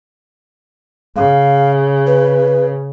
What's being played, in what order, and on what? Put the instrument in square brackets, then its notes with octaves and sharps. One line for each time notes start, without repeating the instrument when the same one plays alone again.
[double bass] C#3 [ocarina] F5
[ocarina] B4